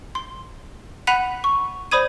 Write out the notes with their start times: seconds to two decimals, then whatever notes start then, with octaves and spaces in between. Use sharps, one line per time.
0.15 C6
1.07 F#5 B5 F#6 B6 D#7 F7
1.44 C#6
1.91 C5 D5 B5 D#6 G#6 D#7